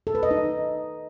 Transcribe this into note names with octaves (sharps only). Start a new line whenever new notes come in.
A4
B4
D#5
D#4